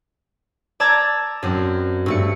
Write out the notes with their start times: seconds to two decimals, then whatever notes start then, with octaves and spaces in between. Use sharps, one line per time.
0.80 D5 A5 A#5 E6 G#6 A6
1.43 F#2 C4
2.06 G2 A3 C#7